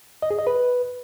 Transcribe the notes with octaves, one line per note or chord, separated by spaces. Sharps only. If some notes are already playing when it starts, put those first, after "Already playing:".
D#5
G#4
D#5
B4